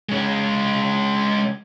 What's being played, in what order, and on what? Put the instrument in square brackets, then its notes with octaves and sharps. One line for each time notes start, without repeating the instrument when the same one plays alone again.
[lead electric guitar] G#3 C#4